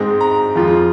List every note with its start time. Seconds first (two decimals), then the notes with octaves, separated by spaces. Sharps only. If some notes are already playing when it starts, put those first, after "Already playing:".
Already playing: G#2 G#3 C4 D#4
0.21 A#5
0.55 F2 F3 G#3 F4